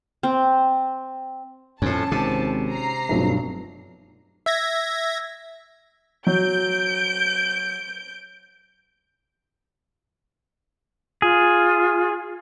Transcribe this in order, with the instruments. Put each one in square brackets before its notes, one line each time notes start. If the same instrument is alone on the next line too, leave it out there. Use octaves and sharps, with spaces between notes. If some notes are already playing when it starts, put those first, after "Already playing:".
[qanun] C4
[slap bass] F2 A2 [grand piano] C#4 [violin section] A5
[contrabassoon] G#1 [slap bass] C3
[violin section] A#5 C7
[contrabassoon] F1 [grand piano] G2 B2 F#3
[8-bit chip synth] E5 G#6 A#6
[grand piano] F#3 [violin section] G6 D7
[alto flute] F4 [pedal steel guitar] G#4